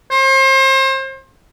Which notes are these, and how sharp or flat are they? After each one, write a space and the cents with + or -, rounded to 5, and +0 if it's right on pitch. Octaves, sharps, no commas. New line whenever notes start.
C5 +35